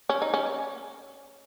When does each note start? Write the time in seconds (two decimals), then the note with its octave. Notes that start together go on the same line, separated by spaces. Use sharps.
0.09 C#4
0.22 D#4
0.34 C#4